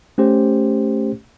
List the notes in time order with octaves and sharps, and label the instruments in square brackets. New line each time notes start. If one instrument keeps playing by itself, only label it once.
[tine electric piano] A3 C#4 G4 C5